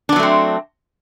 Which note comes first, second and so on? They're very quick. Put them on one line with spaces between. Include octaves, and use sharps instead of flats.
D4 B3 F#3 A3 C4